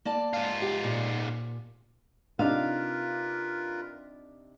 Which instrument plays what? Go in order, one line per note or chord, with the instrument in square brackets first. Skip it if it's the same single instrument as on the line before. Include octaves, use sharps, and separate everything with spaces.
[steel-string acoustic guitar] A#3 D5 A5
[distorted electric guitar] G#2 F4
[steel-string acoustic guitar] G4
A#2
[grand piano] C3 D4 D#4 [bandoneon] F4 A#4 B4 [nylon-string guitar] F5